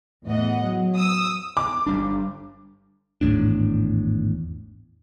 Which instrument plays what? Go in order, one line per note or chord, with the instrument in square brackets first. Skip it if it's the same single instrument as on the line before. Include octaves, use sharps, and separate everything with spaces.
[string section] E2 A2 E3 D#5 F#5
F#3
D#6 E6
[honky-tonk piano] D6
[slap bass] G1 G3 D4
[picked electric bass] G#1 E2 A2 D4